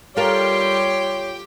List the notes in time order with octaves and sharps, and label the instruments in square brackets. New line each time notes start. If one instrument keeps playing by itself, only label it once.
[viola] G3 C6 [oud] F4 A4 A#4 [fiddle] G4 G5 [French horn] C#5